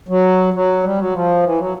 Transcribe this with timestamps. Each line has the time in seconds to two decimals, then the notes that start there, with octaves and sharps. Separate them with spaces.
0.08 F#3
0.54 F#3
0.83 G3
0.98 F#3
1.13 F3
1.43 E3
1.58 F#3